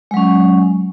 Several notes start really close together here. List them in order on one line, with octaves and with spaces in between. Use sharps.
G#3 F#3 C#4